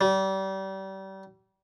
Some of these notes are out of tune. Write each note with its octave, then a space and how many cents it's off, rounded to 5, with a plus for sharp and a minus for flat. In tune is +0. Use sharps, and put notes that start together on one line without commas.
G3 -30